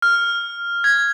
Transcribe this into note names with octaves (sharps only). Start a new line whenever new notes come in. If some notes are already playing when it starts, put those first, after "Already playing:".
F6
G#6